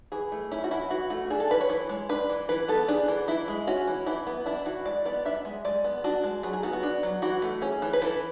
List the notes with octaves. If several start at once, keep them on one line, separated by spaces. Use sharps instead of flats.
E3 G#4
A3
C#4 E4
F#4
E3 E4
E3 F#4
A3 F#4
D4 G#4
A4
E3 B4
C#5
E3
G#3
D4 B4
E3
E3 B4
B3 A4
D4 G#4
E3
E3 E4
G#3
C#4 F#4
E3
E3 E4
B3
D4 E4
E3 F#4
G#3 D5
B3 D5
D4 E5
G#3
G#3 D5
B3
D4 F#4
G#3
F#3 G#4
G#4
B3 F#4
F#4
D4
F#3
E3 F#4
A3
C#4 G#4
E3
B4
E3 A4